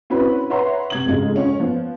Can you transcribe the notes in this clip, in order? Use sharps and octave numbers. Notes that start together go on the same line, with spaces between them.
C4 C#4 E4 F#4 B4 B5
B4 C#5 E5 F#5 A#5 C6
C3 G#6 F#7
F2 G#2 C#3 G#3
C#4 F4
F3 B3